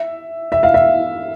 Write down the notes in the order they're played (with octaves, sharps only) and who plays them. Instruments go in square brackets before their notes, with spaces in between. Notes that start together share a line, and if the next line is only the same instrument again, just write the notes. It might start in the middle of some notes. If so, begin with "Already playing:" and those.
Already playing: [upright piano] E5
E5
F5
E5